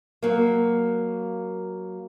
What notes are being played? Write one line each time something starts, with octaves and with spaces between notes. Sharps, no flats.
F#3 A#3